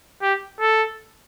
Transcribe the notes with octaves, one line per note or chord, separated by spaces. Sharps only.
G4
A4